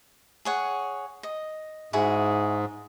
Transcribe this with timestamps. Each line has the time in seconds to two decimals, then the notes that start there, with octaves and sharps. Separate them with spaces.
0.45 G#4 C#5 F#5
1.23 D#5
1.93 G#2 E4 F#4 G#4